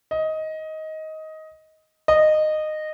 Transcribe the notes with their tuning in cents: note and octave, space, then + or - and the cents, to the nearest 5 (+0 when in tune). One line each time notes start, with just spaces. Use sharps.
D#5 +15
D#5 -15